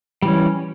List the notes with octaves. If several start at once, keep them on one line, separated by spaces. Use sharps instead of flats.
E3 G3 C#4